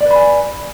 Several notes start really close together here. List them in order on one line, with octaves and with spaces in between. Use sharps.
D5 B4 B5 G#5